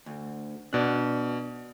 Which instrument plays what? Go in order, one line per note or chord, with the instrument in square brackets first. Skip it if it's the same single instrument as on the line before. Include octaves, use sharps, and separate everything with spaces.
[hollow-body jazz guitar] D2
[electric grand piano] B2 F#6 [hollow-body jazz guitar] D4 D5